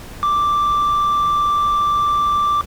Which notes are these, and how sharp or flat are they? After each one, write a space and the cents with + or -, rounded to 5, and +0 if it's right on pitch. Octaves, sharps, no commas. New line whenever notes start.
D6 +0